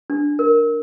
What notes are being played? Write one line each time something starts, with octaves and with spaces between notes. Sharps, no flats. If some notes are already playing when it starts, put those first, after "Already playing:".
D4
A#4